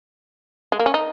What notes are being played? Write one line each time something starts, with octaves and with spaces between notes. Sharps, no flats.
G#3
A#3
C#4
D#4